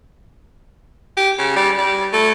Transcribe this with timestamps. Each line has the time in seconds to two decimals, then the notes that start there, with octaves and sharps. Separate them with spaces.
1.17 G4
1.38 C#3
1.56 G3
1.77 G3
2.13 A3